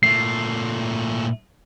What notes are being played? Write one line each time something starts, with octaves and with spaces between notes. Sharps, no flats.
A#2 A3 C7